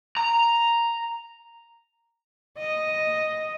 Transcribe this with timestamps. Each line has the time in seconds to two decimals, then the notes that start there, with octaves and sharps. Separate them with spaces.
0.17 A#5
2.58 D#5